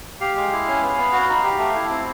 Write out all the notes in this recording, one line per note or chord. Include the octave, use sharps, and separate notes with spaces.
G4 F5
G#3
E4
C#4
B3
B3
F#4
D#4
G4
A3
E4
C4